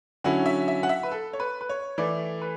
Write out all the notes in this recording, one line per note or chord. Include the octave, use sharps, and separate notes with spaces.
D3 F#3 C#4 E4 F#5
E5
E5
F#5
E5
B4
A4
C#5
B4
B4
C#5
E3 A3 E4 D5
B4